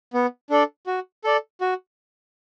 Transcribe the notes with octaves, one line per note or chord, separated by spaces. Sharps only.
B3
D4 A4 D5
F#4
A4 D5
F#4